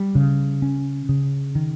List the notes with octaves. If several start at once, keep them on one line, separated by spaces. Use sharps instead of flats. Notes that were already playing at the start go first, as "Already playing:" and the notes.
Already playing: G3
C#3
C#4
C#3
D#3